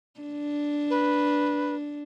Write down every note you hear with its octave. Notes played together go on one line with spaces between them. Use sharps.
D4
B4